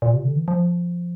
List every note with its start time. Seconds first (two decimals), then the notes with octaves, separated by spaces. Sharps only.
0.02 A#2
0.13 C3
0.25 D3
0.36 E3
0.48 F3